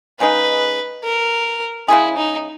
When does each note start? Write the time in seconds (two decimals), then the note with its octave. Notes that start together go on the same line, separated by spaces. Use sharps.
0.20 C#3 G#3 D#4 G#4 B4
1.04 A#4
1.88 C#3 G#3 C#4 E4 G#4
2.17 D#4